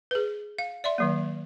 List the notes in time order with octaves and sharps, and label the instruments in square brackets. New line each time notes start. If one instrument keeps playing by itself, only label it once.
[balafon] G#4 B4
F5
D5 E5 C6
D#3 F#3 A#3